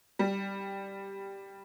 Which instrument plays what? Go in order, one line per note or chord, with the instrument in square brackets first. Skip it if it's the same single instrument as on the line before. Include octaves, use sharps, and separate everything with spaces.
[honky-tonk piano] G3